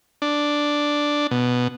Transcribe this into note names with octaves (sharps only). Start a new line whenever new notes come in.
D4
B2